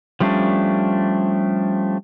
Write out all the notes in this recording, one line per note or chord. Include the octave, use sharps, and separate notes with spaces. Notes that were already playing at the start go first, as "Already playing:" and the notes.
F3 G3 A3 C#4 D4